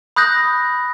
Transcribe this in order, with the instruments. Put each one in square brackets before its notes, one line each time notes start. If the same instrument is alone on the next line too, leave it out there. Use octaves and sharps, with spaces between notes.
[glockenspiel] B5 D#6 F#6 G6 A#6